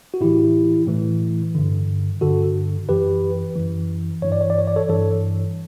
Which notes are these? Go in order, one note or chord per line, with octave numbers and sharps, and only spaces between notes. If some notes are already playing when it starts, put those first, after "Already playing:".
F#4
A2 E3 E4 G4
A2 E3
G2 D3
G2 D3 F#4 A4
F#2 E3 G4 B4
F#2 E3
G2 E3 C#5
D5
C#5
D5
C#5
D5
A4 C#5
G2 E3 A4 C#5